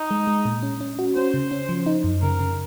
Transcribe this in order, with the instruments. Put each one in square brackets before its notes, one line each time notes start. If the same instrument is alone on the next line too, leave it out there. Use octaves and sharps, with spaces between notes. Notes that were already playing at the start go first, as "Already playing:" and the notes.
Already playing: [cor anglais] D#4
[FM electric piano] G#3
G#3
A#2
C#4
C#4
F#4
[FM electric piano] C#4 [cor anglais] C5
[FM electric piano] C#3
C#4
F3
D#4
F#2
[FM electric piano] C#3 [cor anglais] A#4
[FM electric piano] C#3